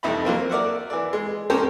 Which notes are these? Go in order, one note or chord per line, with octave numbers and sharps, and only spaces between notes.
C2 F2 D#4 E4 B5
F#3 A#3 C4
A#4 D5 E5 F#5
E3 D5
G#3
C4 C#4 G4 A4 A#4 C5